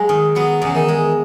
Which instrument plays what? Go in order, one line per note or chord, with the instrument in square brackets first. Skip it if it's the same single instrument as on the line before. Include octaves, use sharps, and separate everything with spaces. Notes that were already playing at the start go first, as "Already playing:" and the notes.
Already playing: [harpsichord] F#3 [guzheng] G#3
[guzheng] D#3
[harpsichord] F#3 [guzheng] B3
[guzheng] E2 [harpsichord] C#3
[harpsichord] D#3
[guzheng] G#3